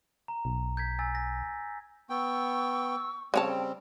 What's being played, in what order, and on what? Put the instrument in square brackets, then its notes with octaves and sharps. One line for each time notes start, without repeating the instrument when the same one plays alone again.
[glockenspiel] A#5
[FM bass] B1
[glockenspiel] G6 G#6 B6
G#5 E6 A6
A#6
[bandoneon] B3 G5 [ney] C#6 [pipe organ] E6
[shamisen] C#3 C#5 A5 [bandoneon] G3 C4 [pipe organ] G5